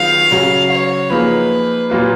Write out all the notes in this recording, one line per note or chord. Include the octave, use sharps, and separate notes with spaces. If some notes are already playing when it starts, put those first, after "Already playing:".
Already playing: D#3 F#3 B3 F4 G#4 F5
C#3 F#3 C#4 F#4
C#5
F3 A#3 D#4 G#4 B4
A#2 F#3 A#3 F4 B4